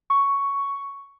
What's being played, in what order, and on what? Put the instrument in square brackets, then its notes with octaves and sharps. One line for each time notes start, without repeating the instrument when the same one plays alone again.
[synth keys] C#6